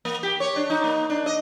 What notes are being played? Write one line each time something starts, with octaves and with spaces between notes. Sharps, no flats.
A#3
G4
C#5
D4
D#4
A#3
D4
D#5